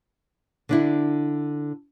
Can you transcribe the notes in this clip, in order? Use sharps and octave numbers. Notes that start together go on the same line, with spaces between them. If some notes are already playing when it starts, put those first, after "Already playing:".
D3 D4 E4